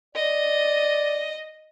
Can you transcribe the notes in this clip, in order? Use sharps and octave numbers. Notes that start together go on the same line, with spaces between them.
D5 D#5